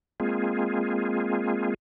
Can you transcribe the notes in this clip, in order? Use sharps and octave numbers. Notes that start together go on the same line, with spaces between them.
G#3 A#3 C4 F4 G#4